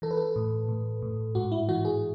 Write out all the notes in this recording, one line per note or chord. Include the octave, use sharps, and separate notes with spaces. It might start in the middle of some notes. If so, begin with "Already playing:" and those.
E3 A4
B4
A4
A2
A2
A2
G#2 F#4
E4
E3 F#4
G#4